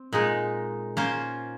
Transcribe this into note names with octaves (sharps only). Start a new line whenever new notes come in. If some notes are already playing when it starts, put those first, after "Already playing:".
Already playing: C4
A#2 G#3 D#4
A#3 C#4 F4 C5